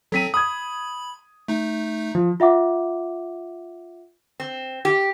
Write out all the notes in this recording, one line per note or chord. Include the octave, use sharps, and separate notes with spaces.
F#3 C4 A4 B6 D#7
B5 D#6 G#6
A3 D#4
F3
F4 E5 F#5 D6
C4
G4